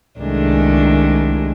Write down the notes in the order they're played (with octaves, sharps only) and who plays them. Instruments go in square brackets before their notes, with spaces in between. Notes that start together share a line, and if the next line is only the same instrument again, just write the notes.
[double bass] C2 G#3 [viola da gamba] D#3 A3 D4